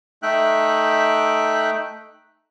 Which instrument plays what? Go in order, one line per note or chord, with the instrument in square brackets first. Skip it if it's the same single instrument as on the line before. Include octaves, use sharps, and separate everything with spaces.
[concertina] A3 D#4 E5 G5 F#6